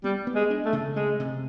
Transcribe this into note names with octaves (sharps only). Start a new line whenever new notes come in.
G3 B3
B3
G#3
D4
A3
C#3
G#3 A3
C3